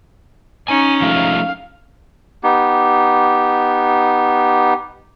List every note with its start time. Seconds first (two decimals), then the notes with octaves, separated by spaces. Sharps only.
0.68 C#4 D#4 G#5
1.02 F3 G#3 A3 F5
2.43 B3 D#4 G4